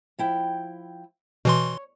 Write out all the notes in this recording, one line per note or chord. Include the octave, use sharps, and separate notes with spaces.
F3 E4 G5
B2 E3 C#5 C6